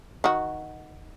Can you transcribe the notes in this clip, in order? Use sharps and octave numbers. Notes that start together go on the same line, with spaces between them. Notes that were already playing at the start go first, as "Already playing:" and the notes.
D#3 F#4